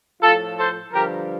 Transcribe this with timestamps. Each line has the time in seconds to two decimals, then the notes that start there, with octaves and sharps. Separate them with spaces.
0.22 A2 F3 F4 A4
0.58 A4 C5
0.93 G2 D3 F3 G4 A#4